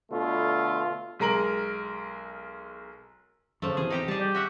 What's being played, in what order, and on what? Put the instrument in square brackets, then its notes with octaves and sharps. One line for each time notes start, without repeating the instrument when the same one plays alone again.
[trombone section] B2 D3 A3 F4
[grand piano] B1 G#3 A#4 F#7
[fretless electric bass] F#2 C#3 [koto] F3 A3
[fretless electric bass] E2 C3 E3 [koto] G#4
[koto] D#4 G4 A#5
[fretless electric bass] G3 [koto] G#4 A5 [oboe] D5
[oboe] G4
[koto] F#4 E5 F#5